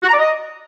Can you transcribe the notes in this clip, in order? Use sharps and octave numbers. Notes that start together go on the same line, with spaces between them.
F#4
A#5
D5
D#5